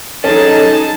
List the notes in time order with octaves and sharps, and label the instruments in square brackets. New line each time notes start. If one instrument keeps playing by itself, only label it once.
[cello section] F#3 D#4 G#4 [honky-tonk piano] C#4 [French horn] A4 [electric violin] A5